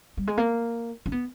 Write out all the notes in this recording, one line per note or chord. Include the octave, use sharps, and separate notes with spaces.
G3
G#3
A#3
C#4
B3